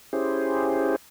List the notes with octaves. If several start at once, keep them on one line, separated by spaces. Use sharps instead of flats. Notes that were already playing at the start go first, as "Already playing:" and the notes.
C#4 E4 G4 G#4 C5